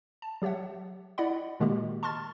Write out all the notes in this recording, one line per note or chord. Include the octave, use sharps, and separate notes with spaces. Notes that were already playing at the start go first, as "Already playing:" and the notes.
A5
F#3 G4 C#5 E5 F#5
E4 D5 D#5 F#5 B5
A#2 D#3 G#3 A#3 F#4 G4
A5 C6 C#6 F6 A6